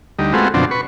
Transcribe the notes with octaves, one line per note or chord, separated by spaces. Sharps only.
D2 G3 D#4
G#3 A3 B3 C4 F4 F#4
F#2 B2 D3 F3 C4 D4
B4 C#6